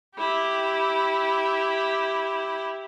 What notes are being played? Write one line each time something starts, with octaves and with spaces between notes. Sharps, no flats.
E4 G4